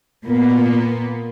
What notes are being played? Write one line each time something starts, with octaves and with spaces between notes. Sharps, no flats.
A#2 A#3 B3